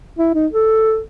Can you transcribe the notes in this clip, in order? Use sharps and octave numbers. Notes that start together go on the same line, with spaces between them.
E4
D#4
A4